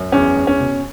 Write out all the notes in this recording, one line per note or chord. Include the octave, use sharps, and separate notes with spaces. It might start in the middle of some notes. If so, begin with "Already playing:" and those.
Already playing: F#2
E2 C#4
E2
C#4
B2